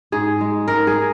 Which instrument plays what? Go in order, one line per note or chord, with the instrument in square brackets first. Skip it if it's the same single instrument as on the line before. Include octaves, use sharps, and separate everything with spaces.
[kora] G#2 G#4
G#3
G#2 A#4
G#4